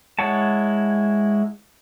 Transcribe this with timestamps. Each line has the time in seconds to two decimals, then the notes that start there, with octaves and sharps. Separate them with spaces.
0.19 G#3 E4 C#5 F#5 A5